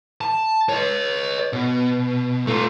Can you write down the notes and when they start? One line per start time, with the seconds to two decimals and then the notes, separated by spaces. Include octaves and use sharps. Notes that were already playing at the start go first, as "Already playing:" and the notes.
0.21 A5
0.69 C#5 D#5
1.53 B2
2.47 A3 F4